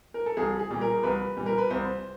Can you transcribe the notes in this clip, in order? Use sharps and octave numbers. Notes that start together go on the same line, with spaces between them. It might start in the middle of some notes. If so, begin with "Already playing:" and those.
A#4
A4
C2 G#4
G#4
A#2 G3
A#4
C2 B4
A#2 G3
A#4
B4
C2 C5